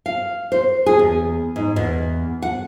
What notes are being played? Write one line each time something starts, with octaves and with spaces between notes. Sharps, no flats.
F5
C5
G#4
E2
G#2
E2
F#5